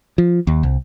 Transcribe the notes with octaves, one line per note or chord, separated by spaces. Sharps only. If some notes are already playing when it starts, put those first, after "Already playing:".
F3
D#2
C2